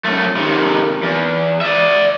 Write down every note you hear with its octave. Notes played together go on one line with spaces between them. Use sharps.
F#2 A3
C3 D#3
E2
D5 E5